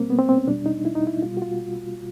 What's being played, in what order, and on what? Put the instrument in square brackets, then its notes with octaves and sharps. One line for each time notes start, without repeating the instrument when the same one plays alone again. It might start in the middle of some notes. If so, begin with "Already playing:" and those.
Already playing: [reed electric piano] B2 G3 A#3 C4
B3
C4
C4
C#4
E2 B2 G3 D4
D#4
E4
D#4
E4
B2 G3 F4
F#4
F4